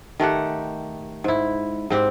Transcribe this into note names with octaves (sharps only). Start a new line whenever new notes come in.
D#3 A3 G4 F#5
G#2 E4
G#2 C4 G4